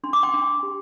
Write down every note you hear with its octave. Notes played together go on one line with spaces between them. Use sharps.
D4 C6
D6
G5 C6
D4
G4